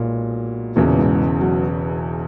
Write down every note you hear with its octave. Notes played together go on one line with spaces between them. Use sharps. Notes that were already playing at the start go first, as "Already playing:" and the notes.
Already playing: B1 A#2 G#3
E1 E2 A#2 C#3 E3
G#2
F#3